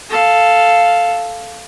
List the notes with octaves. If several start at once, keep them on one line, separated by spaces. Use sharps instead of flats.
A4 F5